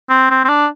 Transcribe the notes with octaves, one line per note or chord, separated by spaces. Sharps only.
C4
C4
C4
D4